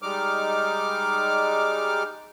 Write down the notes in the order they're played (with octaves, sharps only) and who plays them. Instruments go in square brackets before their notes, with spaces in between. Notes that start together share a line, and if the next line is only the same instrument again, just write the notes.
[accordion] G3 G#3 D#4 D6 F6